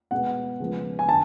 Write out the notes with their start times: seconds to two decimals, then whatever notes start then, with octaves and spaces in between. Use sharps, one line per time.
0.11 B2 G#3 B3 F#5
0.60 C#3 F3 G#3 B3
0.99 G#5
1.08 D3 A5